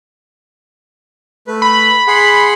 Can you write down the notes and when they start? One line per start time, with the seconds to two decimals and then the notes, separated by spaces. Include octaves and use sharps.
1.47 A3 B4
1.62 B5
2.07 G#4 F#5 C6